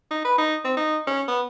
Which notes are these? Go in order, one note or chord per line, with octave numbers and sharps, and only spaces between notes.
D#4
B4
D#4
C4
D#4
C#4
B3